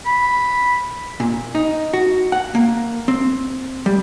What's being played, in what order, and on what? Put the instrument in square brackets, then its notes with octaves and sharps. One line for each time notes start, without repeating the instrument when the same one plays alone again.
[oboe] B5
[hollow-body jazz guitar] A#2
D#4
F#4
F#5
A#3
C4
G3